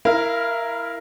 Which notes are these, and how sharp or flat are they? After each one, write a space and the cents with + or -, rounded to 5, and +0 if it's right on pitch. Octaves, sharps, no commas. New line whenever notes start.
E4 +0 A#4 +0 F5 -30